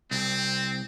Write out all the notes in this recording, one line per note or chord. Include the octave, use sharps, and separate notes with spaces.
C2 C4